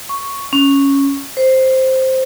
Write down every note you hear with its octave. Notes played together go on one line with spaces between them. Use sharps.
C#6
C#4
C5